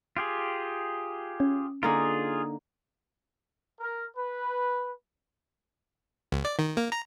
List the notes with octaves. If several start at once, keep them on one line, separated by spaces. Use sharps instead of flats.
F4 G4 G#4
C#4
D3 A#3 D#4 F4 G#4
A#4
B4
C#2
D5
D#3
A#3
A#5